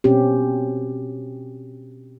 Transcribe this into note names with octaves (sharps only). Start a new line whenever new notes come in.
B2 C4 C#4 G4